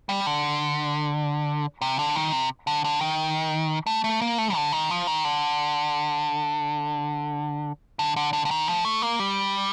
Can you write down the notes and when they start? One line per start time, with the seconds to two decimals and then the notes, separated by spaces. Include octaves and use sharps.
0.09 G3
0.26 D3
1.81 C3
1.99 D3
2.16 D#3
2.32 C3
2.67 D3
2.84 D3
3.01 D#3
3.87 A3
4.04 A3
4.21 A#3
4.38 A3
4.55 D3
4.73 D#3
4.90 F3
5.07 D#3
5.25 D3
7.99 D3
8.16 D3
8.33 D3
8.45 D3
8.51 D#3
8.68 F3
8.85 A3
9.02 A#3
9.19 G3